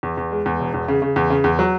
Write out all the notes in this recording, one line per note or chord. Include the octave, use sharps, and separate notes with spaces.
E2
E2
G#3
E2
E1
E2
C#3
C#3
E2
C#3
E2
F#3